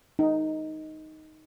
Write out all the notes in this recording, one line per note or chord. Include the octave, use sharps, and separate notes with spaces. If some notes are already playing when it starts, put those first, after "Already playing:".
D#4